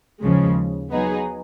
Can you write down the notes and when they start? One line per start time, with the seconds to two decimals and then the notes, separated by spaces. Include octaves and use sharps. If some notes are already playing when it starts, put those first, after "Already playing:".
0.22 D#2 C#3 F3 G#3
0.90 F#3 B3 D#4 G#4